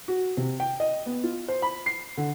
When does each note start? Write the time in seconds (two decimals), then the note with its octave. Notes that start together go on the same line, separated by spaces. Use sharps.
0.08 F#4
0.37 C3
0.60 G5
0.80 D#5
1.06 B3
1.24 F4
1.48 C5
1.62 B5
1.86 C7
2.17 D3